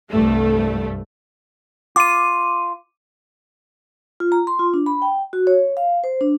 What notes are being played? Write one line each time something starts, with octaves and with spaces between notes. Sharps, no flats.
C2 G2 A3
F4 D6 D#7
F4
A#5
C6
F4
D4
B5
G5
F#4
C#5
F5
C5
D4